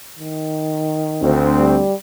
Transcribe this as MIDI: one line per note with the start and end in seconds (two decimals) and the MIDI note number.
0.19 1.36 51
1.22 1.79 38
1.22 1.79 60
1.59 1.94 55